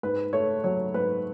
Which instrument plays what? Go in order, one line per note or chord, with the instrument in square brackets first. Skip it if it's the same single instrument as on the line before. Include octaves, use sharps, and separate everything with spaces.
[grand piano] G#2 B4
A3 C#5
F#3 C#5
G#2 B4